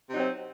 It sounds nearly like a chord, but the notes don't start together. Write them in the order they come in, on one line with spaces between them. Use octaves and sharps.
C3 D#4 F#3 C4